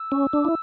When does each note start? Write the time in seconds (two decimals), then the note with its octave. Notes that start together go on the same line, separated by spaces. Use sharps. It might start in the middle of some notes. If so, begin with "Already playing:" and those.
Already playing: E6
0.12 C#4
0.33 D4
0.45 E4